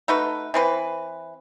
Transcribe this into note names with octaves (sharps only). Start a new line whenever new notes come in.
A3 D#4 F#4 B4
E3 C4 B4